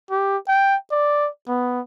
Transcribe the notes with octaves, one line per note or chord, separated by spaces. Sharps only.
G4
G5
D5
B3